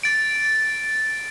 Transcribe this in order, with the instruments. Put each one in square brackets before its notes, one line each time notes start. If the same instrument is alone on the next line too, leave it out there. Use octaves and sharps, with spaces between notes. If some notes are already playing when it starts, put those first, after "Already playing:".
[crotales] A6 D7